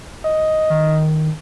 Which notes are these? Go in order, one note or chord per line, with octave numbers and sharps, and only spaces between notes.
D#5
D#3